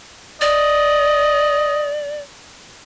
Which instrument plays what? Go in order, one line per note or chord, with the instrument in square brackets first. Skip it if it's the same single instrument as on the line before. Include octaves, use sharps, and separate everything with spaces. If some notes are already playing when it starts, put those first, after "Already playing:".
[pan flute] D5 [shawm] D#5